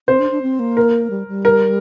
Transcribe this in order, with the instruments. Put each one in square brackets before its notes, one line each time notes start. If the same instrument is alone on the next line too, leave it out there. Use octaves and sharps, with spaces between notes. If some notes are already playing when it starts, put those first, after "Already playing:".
[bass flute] C4 [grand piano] C5
[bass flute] D4
D4
C4
A#3
[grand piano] A#4
[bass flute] G3
G3
[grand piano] A#4